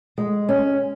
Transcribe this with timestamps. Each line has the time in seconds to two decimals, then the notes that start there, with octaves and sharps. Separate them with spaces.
0.18 G#3
0.49 C#4